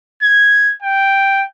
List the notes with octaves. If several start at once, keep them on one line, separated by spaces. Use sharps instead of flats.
G#6
G5